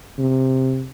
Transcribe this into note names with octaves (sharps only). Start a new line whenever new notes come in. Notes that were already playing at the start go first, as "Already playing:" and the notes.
C3